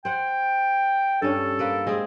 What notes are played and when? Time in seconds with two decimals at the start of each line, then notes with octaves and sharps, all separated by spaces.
0.05 C5 F#5 G5
1.22 G2 C#4 D4 A4
1.59 A#3 B4 D5
1.87 G#3 C4 G#4